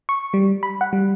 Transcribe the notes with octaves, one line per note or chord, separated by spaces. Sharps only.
C#6
G3
B5
F#5
G3